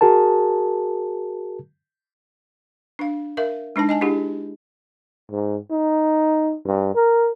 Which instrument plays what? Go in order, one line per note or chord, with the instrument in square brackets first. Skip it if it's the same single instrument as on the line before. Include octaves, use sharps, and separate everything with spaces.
[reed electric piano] F#4 G#4 A#4 A5
[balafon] D4 F5
A#4 E5 F5
G#3 D4 D#4 A5
D#5 G#5 A5
D4 E4 G4 G#4
[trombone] G#2
D#4
G2
A#4